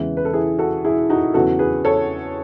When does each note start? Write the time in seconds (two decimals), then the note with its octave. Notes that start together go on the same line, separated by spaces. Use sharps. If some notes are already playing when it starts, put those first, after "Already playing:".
Already playing: E2 C#3 E3 G#3
0.17 B4
0.25 A4
0.34 E4 G#4
0.59 F#4 A4
0.85 E4 G#4
1.10 D#4 F#4
1.34 E2 C#3 F#3 F#4 A4
1.59 G#4 B4
1.85 A4 C#5